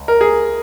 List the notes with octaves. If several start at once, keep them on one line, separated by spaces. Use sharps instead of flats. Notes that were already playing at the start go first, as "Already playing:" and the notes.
Already playing: C#2
A#4
G#4